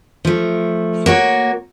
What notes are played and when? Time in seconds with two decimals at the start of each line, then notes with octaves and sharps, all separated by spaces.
0.25 F3 A3
1.06 A#3 F#4 C#5